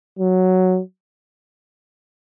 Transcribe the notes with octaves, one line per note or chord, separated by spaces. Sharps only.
F#3